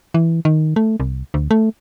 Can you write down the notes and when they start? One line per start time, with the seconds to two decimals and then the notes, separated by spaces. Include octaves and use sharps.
0.14 E3
0.45 D#3
0.76 A3
1.00 C2
1.34 D2
1.51 A3